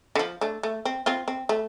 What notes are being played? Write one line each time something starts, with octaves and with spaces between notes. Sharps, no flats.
D3
F3
A3 D4
A3
C4
C4 F4
C4
A3